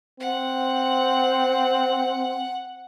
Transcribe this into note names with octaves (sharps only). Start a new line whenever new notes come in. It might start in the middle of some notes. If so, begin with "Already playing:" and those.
C4 F#5